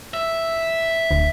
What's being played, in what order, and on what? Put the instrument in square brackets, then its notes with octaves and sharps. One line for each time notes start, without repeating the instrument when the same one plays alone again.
[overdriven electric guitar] E5
[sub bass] D1 [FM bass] D2